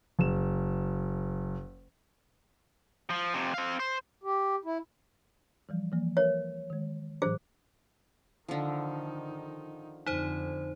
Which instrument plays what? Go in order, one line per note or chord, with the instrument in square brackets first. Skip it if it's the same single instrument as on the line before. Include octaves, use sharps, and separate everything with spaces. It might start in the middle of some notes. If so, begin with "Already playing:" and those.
[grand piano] F#1 E7
[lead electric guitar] F3
F2 C3
C4 F5
C5
[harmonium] G4
E4
[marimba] E3 F3 G3
E3 F3 A#3
[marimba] A#4 B4 E5 [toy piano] C#5
[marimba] D#3 G#3
[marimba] A2 E3 F#3 [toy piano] G#4 C5
[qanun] D3 F3 [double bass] D#3 D#4
[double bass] F2 D3 [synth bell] D#4 C5